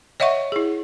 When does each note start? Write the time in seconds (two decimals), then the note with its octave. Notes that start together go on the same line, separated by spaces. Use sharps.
0.20 C#5 D#5 E5 F#5 C#6
0.52 E4 G#4